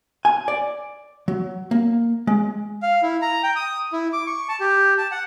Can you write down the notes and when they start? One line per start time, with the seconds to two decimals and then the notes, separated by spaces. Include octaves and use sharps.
0.25 G#5
0.48 D5
1.28 F#3
1.71 A#3
2.27 G#3
2.82 F5
3.03 E4
3.22 A#5
3.43 G5
3.56 D#6
3.93 E4
4.13 D6
4.27 C#6
4.49 A5
4.60 G4
4.98 A5
5.12 F#5